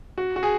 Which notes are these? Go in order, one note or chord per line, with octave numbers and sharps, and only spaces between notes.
F#4
F#4
G#4